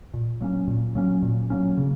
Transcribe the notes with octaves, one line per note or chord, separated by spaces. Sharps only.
A#2
F#3 A#3 C#4
A#2
F#3 A#3 C#4
A#2
F#3 A#3 C#4
C#3